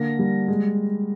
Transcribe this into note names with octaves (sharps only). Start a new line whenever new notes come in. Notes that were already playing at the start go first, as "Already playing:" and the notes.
Already playing: D3 A#3 A#6
G3
G#3